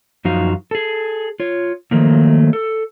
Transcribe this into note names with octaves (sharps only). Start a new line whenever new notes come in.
F#2 F3 D#4 F#4 F5
G#4 A4
F4 C#5
D#3 F3 F#3 A3 A#3
A4